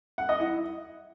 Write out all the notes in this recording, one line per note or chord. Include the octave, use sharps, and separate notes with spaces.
F#5
D#5
E4